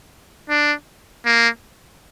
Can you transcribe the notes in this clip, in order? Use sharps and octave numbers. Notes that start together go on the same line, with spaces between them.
D4
A#3